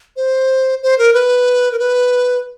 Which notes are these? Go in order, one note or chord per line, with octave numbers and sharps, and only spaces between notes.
C5
C5
A#4
B4
A#4
B4